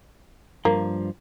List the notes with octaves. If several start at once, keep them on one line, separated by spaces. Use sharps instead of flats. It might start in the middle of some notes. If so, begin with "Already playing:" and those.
G2 F3 A#3